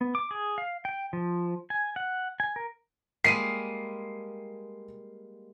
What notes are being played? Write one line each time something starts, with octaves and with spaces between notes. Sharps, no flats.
B3
D6
G#4
F5
G5
F3
G#5
F#5
G#5
A#4
G3 G#3 A#3 C7 D#7